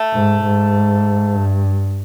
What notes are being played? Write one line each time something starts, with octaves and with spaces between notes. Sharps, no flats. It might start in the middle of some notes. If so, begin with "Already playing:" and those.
Already playing: A3
G#2
G#2
G2